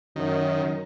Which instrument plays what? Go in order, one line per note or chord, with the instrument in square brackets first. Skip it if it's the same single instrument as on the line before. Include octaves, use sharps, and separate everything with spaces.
[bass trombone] F#2 [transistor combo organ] D#3